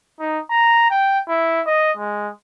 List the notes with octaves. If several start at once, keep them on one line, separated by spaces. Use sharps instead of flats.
D#4
A#5
G5
E4
D#5
G#3